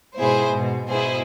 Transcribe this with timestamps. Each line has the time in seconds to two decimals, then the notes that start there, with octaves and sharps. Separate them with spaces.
0.17 G#2 B2 E4 G#4 C5
0.54 G#2 B2
0.89 G#2 B2 E4 G#4 C5